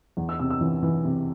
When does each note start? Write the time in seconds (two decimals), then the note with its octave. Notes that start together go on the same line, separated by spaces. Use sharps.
0.17 E2
0.29 E6
0.39 C3 E6
0.50 E6
0.61 E3
0.83 E3
1.04 C3